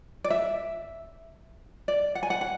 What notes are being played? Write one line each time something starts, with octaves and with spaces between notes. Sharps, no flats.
D5
E5
D5
F#5
G#5
F#5
F#5